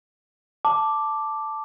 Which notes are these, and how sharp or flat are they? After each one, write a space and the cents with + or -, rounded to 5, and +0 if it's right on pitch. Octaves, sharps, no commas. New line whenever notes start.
A5 +0 D6 +0